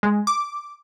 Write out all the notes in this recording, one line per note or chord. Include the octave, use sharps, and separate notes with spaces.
G#3
D6